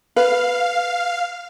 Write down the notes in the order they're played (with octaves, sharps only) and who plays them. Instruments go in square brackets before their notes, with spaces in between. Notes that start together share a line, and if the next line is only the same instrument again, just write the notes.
[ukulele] B4 [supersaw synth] F5